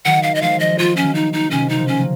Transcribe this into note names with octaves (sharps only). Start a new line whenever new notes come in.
D#3 F#3 F#5
F5
D#5
F3 G#3 F5
D#5
F#3 A#3 F4
C#4
D#3 F#3
D#4
D#4
C3 D#3 C#4
D#4
C#3 F3
C#4
F#3 A#3